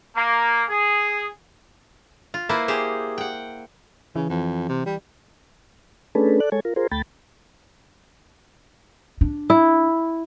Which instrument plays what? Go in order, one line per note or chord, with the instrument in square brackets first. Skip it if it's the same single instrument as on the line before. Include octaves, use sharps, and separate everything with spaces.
[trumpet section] A#3
G#4
[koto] F4
A#3 E4 B4 C5
G4 G#4 C5
F#5 G5
[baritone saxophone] C#3 [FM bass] E3
[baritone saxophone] F2
C3
G3
[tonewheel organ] A3 C#4 D4 G#4 A4 B4
A4 D5 F#6
G#3 A4 C#5 G#5
F4 A#4
F4 G#4 A#4 C5
D2 A3 G5 B5 A6
[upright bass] D4
[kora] E4